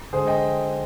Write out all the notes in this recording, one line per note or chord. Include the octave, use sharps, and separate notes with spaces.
D3 G#3 G#4 C5
D#5 G5